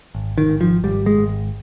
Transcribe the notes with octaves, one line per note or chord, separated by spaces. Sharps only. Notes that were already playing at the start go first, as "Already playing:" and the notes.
G#1
D#3
G#1
F3
G#1 G3
G#3
G#1